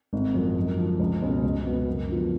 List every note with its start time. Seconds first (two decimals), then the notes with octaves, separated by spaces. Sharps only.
0.13 G#1
0.34 F#2 F3 G#3
0.56 F#2
0.78 D3 F3
0.99 C#2
1.22 B2 G#3 C#4
1.43 C#2
1.66 B2 F#3 B3
1.88 F#2
2.09 D3 F3 B3 F4